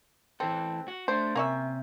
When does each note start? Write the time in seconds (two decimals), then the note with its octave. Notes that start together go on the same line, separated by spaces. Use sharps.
0.40 E3 C4 A4
0.88 F#4
1.08 A3 D4 C5
1.35 C3 A#3 C#4 E5